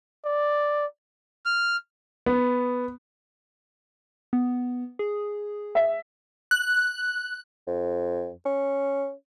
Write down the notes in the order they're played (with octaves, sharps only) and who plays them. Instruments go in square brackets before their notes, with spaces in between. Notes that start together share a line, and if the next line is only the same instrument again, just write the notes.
[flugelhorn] D5
[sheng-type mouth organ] F6
[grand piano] B3
[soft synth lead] B3
G#4
[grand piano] E5
[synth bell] F#6
[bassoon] F2
C#4